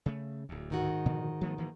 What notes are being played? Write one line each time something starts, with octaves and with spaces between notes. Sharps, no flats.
C#3 A3
D1 D2
G#2 D#3 F#4
A#2 D3 F3
F3 A3 B3
E3 F3 A#3